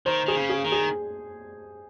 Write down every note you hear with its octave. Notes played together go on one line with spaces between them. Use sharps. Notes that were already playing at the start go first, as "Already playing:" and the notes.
D#3 C5
D#3 G#4
C#3
G#4
D#3
G#4